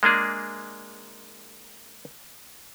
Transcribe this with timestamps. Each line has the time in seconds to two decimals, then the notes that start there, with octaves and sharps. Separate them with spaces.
0.03 G#3 A#3 D4 G#4